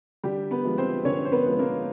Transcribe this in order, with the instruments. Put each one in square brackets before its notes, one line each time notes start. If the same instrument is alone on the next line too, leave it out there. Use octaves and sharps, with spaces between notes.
[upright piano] D3 G3 G4
B3 B4
F3 G#3
C4 C5
D3 C#4 C#5
C5
B3 B4
F3 G#3
A#3 A#4